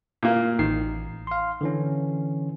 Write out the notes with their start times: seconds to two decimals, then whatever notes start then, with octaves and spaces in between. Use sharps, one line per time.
0.23 A#2 A#3
0.59 A1 D#3 C7
1.27 F5 C6
1.61 D3 E3 C#4